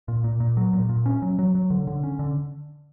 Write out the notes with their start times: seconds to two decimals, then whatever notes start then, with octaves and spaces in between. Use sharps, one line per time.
0.08 A#2
0.24 A#2
0.40 A#2
0.57 F#3
0.73 A#2
0.89 A#2
1.06 C#4
1.22 F#3
1.39 F#3
1.55 F#3
1.70 D3
1.87 D3
2.03 C#4
2.19 D3